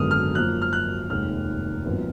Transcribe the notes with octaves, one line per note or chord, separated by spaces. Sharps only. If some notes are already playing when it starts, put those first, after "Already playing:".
Already playing: G#1 F#2 D3 G#3 B3 D#6 F6
F6
F#2 F3 A#3 F#6
F6
F#6
F1 D#2 D#3 G#3 F6
G#1 F#2 F3 B3